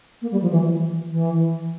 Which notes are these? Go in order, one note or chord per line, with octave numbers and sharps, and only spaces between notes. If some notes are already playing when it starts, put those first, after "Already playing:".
A#3
G3
F3
E3
E3